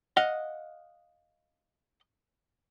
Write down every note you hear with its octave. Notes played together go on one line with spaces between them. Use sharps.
D#5 F5 F#5